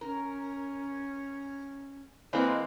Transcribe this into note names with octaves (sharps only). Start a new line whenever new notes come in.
C#4 A#4
E3 G#3 A#3 C4 A#4 B4 D#5